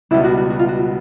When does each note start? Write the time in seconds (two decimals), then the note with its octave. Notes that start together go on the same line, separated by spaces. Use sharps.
0.11 C#2 B2 G3 B3 E4
0.24 F#4
0.38 F#4
0.50 F#4
0.59 F4
0.68 F#4